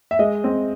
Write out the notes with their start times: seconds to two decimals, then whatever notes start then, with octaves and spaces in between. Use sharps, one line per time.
0.11 E5
0.19 G#3 D#5
0.44 C4